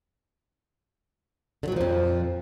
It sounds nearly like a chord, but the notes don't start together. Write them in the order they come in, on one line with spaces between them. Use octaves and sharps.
D3 F#3 A#2 F3 F2